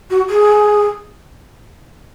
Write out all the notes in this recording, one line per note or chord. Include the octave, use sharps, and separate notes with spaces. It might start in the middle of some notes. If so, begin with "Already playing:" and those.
F#4
G#4